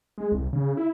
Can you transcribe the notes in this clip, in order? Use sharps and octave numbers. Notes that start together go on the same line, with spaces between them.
G#3
C2
C#3
E4